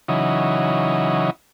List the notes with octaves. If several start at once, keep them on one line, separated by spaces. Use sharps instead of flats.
C#3 E3 F#3 D#4